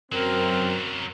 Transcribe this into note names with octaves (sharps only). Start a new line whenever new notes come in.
F#2 F#3 A#3 C4 A#4